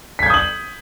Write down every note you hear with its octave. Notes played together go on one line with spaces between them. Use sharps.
D#6 G6 G#6 B6 F#7